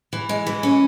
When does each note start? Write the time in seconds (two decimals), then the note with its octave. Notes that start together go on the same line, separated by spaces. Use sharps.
0.13 E3
0.29 G#3
0.47 E3
0.63 C#4